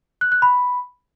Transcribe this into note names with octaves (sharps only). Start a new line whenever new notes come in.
F#6
F#6
B5